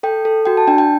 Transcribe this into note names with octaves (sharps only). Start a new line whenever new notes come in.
A4 G5
A4
F#4 G5
A5
D4 G5
G5